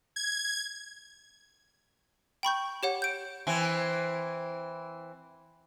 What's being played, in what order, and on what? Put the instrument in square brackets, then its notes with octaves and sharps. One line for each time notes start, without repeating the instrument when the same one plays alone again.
[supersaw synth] G#6
[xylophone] G5 B5 C#6 G6
G4 C#5 F#5
G6 D7
[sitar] E3 C4